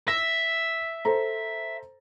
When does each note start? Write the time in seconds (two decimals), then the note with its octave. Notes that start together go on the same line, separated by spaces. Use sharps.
0.08 E5 A#6
1.05 A4 C5 A#5